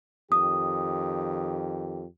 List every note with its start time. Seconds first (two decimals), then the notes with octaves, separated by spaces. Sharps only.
0.32 F2 D#3 G4 D#6